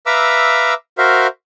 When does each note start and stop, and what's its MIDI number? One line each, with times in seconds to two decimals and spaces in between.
0.06 0.74 71
0.06 0.74 76
0.06 0.74 77
0.06 0.74 82
0.06 0.74 86
0.06 0.74 88
0.98 1.27 66
0.98 1.27 70
0.98 1.27 72
0.98 1.27 76
0.98 1.27 77